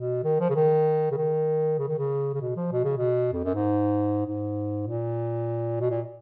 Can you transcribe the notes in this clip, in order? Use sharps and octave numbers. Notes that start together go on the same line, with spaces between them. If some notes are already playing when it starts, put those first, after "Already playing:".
Already playing: B2
D#3
F3
C#3
D#3
C#3
D#3
C#3
D#3
C#3
C#3
B2
F3
B2
C#3
B2
F2
F#2
G#2
G#2
A#2
B2
A#2